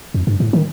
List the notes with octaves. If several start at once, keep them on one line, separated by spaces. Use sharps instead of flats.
F2
G2
A2
D#3